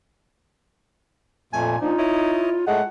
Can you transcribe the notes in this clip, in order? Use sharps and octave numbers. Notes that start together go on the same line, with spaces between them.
F2 A#2 A3 G#5
A#2 F3 D4 D#4 F4
E4 C#5 D#5
A2 G#3 A3 F#5